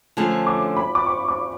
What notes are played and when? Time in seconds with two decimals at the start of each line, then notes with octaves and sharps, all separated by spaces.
0.17 D3 F3 A3 C#4
0.47 D6
0.77 B5
0.95 D6
1.06 C#6
1.28 D6